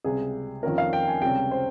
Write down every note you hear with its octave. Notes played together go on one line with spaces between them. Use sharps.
C#2 C3 G3 G#4
F2 D#3 A#3 C#4 A#4
F5
G5
G#5
C#2 C3 G3 C#4 G5
C5